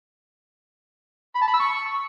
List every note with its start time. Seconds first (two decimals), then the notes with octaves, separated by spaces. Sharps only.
1.36 B5
1.42 A5
1.48 B5
1.54 E6
1.60 C#6